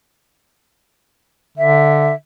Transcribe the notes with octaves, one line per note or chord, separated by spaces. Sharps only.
D3 E5